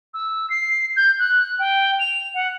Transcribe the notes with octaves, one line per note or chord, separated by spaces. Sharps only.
E6
C7
G6
F#6
G5
F7
F#5